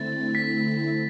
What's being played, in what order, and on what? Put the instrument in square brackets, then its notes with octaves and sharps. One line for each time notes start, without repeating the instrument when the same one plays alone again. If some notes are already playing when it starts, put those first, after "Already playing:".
Already playing: [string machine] D3 A3 C4 E4 [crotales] A6
[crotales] B6